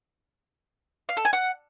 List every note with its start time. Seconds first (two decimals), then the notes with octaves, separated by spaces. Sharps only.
1.09 F5
1.17 A4
1.25 G#5
1.33 F#5